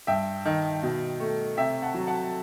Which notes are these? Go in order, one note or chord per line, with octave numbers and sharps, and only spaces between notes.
G2 E5 G5
D#3
B2
A3
C3 E5 G5
F#5 A5
F#3
F#5 A5